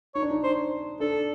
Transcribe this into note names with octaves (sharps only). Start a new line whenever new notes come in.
D#4 C#5
D4
D#4
C5
D4 A4